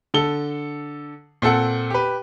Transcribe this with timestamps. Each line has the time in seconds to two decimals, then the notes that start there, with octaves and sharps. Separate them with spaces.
0.14 D3 A4 G7
1.42 A#2 C4 A4 F#5
1.90 G4 B4